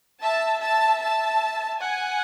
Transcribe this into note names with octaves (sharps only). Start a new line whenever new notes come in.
E5 A5
E5 A5
A5
F#5 G#5